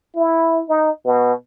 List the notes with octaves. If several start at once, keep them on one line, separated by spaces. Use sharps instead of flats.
E4
D#4
B2